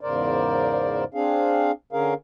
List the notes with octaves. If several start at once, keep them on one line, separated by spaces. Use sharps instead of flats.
E2 G#2 C#3 A#4 C5 D5
C4 D4 G#4 F5
D3 C#4 G#4 A#4 F5